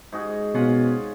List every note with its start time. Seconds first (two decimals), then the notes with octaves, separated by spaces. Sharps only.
0.12 G#2 F#4 G#4
0.54 B2 C#4 F4 F#5